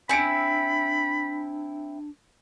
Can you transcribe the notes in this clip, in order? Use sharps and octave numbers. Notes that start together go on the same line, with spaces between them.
C4 D4 E4 G#5 B5 C#7 D7